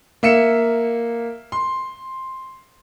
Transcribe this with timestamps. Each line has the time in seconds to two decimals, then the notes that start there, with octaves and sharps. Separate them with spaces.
0.23 A#3 E5 C#7 E7
1.52 C6